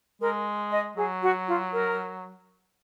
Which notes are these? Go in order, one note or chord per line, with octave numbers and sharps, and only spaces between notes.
G#3 A#4
D#5
F#3 G#4
F#4
F4
A#4